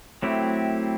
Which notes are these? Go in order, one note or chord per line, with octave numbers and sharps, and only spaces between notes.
F#3 A3 C4 E4 G4